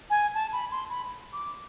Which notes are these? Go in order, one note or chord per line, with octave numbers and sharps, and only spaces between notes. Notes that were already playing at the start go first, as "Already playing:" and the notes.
G#5
A5
B5
C6
B5
D6